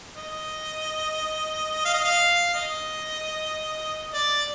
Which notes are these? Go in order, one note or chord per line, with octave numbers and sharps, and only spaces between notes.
D#5
F5
D#5
F5
D#5
D5